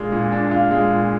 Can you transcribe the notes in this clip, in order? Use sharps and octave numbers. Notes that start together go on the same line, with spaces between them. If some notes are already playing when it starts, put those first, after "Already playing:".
Already playing: A#2 G#3 D4 F4
A#2
D4
F4
G#3
A#2